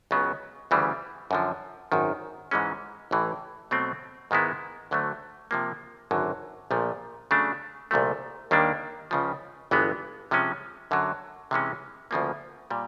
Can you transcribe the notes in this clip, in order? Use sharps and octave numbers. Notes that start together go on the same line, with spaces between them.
C#2 C#3 F#3 B3
D2 C#3 E3 G3
F#2 D3 F3
G#1 F#2 D#3
G#2 E3 G#3 C#4
A1 A2 E3
B2 F#3 A3 C4
G#2 D#3 G#3 B3 E4
D2 D3 F#3 A3
C3 F3 A#3
G#1 F#2 D3 F#3
A#1 A#2 F3 A3
C#3 F#3 A3 D4
C2 A#2 F3 A3
D#2 D#3 G3 A#3 D4
C#2 C#3 F3
G1 G2 E3 G#3 B3
C3 F3 G#3 C#4
F#2 D3 F#3
C3 E3 G#3 C#4
D2 C#3 F3 A#3
A#2 G3